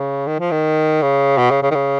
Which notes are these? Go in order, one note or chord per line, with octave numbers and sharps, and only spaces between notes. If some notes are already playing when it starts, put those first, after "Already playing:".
Already playing: C#3
D#3
F3
D#3
C#3
B2
C#3
C#3
D#3
C#3